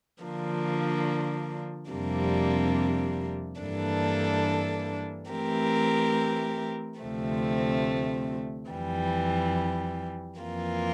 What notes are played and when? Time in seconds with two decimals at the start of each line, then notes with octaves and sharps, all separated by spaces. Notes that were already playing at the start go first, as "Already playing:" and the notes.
0.23 D3 F3 A#3 D4
1.92 F2 C3 G3 A#3 D4
3.61 G2 E3 A#3 D4 A4
5.30 E3 A3 C4 G4 A#4
7.00 D2 C3 F3 A3 C4
8.70 F2 E3 G3
10.39 F2 E3 A#3 F4